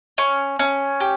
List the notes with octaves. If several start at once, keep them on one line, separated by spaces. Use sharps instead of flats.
C#4
C#4
G4